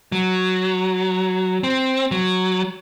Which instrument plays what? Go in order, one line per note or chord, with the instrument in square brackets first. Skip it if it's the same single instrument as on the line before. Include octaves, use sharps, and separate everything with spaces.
[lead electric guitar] F#3
C4
F#3